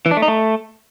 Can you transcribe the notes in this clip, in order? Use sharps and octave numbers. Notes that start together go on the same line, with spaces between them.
E3
D4
A3
D#4
A3